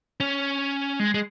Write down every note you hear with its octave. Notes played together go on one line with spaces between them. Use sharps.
C#4
G#3
G#3